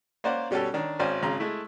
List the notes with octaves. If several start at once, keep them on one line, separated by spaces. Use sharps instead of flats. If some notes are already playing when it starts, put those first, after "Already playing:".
A#3 C#4 A#4 C5 D5 F#5
B2 G3 C#4 G4 A4
D#3 C#4 D4
G#1 C#4 C5 D5 F5 G#5
G#1 C#3 A#5 C6
G#3 A3 E4